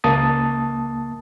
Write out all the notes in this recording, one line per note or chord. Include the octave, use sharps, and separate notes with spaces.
C#2 A#3 A5 D#6 A6